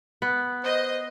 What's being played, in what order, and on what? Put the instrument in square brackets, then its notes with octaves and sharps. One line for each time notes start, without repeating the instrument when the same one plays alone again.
[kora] B3
[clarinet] C5 [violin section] D#5